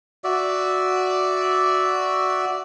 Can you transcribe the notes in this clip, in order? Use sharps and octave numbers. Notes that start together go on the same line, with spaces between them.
F#4 D5 E5